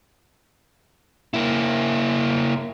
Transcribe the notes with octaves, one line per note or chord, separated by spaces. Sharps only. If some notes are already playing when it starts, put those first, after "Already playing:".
A#3 E4